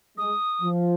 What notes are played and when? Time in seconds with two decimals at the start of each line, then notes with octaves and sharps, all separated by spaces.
0.18 G#3 D#6
0.62 F3